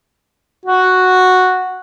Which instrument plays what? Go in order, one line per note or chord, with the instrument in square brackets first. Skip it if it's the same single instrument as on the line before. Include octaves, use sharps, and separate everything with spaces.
[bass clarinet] F#4